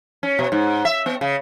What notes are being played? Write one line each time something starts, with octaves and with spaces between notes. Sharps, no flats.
C#4
B2
G#2
E5
B3
C#3